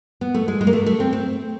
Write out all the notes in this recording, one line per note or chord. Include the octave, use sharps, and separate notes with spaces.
B3
A3
G#3
G#3
A#3
A3
A3
C4
C4